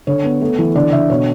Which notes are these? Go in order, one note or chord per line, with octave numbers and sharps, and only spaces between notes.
D3 C#5
B3
A3
E3
D3 D5
D3 E5
B2 C#5